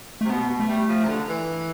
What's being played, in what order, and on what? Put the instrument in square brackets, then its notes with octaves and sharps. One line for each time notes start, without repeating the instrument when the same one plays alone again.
[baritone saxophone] C3 [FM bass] A3
[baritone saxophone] B2 [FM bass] B3
[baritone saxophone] B2
[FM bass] A3
[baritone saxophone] G3
F3
C3
D3
E3